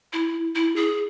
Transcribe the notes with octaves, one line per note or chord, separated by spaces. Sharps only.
E4
E4
G#4